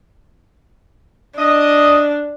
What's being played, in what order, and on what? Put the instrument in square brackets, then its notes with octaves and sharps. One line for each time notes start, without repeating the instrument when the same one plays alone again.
[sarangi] D4 [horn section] D#5